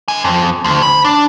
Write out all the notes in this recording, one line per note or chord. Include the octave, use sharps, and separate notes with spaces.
D3 G#5
F2
D2
B5
D4